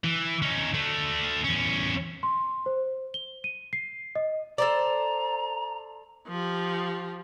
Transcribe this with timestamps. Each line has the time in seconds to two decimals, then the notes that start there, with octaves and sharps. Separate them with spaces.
0.04 E3
0.42 C#4 D#4
0.74 A3 D4
1.44 E2 C#4
2.23 C6
2.66 C5
3.14 G7
3.44 D#7
3.73 C7
4.16 D#5
4.58 A4 C5 D5 A#5
6.28 F3 G4